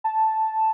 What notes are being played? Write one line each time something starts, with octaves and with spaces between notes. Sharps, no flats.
A5